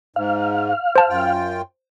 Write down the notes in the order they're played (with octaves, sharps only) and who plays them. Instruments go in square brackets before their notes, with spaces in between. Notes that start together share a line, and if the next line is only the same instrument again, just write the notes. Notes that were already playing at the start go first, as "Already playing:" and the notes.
[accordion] G#2 [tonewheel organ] F5
[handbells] C5 A5
[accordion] F#2 F4 G5